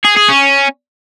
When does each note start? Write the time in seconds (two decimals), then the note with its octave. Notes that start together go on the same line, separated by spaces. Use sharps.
0.04 G#4
0.16 G#4
0.28 C#4